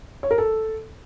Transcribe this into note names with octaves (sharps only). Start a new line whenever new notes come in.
C#5
A#4
A4